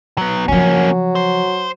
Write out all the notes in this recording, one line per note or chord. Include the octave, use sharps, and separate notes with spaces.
F#3 B3
C#3 F3 F#3 A#3 C#4
C5